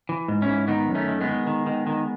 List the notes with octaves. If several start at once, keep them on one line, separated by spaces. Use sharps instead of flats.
E3
G#2
C#4 E4
G#2
D#3 B3 D#4
F#2
A3 C#4
D#3
G#3 B3
D#3
D#3
D#3
D#3